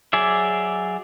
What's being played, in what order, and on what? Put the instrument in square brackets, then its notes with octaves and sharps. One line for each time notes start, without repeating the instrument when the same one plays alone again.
[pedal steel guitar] F#3 G#4 D5 E5